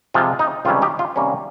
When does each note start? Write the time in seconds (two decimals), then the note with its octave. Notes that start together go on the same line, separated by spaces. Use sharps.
0.14 C3 F3 G#3 F4
0.39 D#4
0.65 C#2 C3 D#3 G3 C#4 F4
0.82 D#4 G4
0.99 F4
1.16 C3 D#3 G3 A#3 C#4